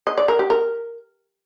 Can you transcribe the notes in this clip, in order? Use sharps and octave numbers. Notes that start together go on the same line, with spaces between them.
D#5
D5
A#4
G4
A#4